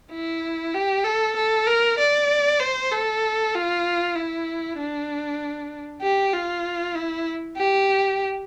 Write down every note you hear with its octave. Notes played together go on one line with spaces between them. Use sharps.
E4
G4
A4
A4
A#4
D5
C5
A4
F4
E4
D4
G4
F4
E4
G4